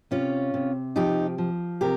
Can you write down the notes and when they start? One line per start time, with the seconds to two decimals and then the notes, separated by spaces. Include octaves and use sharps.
0.11 C3 C#4 F4
0.54 C3
0.96 F3 D#4 G4
1.38 F3
1.81 C3 G4 A#4